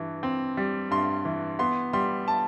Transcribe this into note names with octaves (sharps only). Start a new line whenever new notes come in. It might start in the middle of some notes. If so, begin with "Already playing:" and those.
Already playing: G2 E3
C4
G3
G2 C6
E3
B3 C6
G3 C6
A5